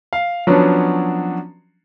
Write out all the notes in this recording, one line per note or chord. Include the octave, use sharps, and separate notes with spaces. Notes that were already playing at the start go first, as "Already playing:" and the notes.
F5
F3 F#3 B3 C#4 D4